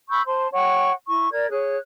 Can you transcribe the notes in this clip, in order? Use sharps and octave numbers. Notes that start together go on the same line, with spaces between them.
B5 C#6 E6 G6
C5 A5 C6
C#5 F#5 G5 C#6
E4 C#6
A#4 D5 G#6
G#4 C#5 F#6